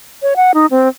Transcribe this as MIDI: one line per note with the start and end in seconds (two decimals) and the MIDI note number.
0.22 0.34 73
0.36 0.52 78
0.54 0.66 63
0.71 0.88 60